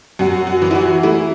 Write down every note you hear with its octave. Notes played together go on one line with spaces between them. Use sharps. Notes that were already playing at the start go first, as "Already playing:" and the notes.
F#2 F#4
F#4
E3
E4
F#4
A3 E4